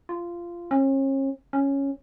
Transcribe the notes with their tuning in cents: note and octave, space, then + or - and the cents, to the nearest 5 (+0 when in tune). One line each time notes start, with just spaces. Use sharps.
F4 -15
C#4 -40
C#4 -5